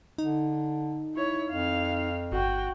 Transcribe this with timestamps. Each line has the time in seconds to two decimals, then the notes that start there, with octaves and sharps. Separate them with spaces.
0.18 D3 D#4
1.15 E4 C#5
1.51 F2 F5
2.32 G1 F#4 G5